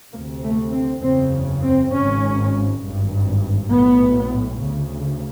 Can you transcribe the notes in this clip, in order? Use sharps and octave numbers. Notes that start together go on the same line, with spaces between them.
D2 C3 A#3
A3
C4
F#1 E2 C#3 C4
C4
G#1 G#2 C#4
G#1 G2
B1 A2 B3
D2 C#3